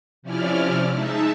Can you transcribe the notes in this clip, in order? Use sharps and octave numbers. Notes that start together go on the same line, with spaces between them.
C3 F3 C#4 E4 D5 F6
G#3 D#4 E5 A5